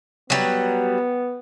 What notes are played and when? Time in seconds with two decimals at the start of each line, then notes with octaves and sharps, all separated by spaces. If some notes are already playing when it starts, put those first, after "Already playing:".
0.30 F#3 G3 B3